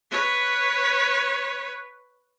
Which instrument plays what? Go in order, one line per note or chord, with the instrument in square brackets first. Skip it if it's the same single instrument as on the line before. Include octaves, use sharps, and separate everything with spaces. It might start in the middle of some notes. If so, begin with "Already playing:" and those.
[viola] B4 C#5